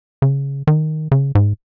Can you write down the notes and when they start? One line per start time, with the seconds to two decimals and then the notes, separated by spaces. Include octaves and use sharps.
0.22 C#3
0.67 D#3
1.12 C#3
1.35 G#2